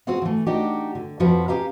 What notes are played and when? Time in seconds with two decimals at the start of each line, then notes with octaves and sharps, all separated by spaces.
0.07 C4 F4 F#4 G#4 F5
0.22 E3 A3
0.46 D4 D#4 F#4 G4
0.95 D3
1.20 F2 F3 F#4 B4 C5
1.48 C#4 G4 F5 A#5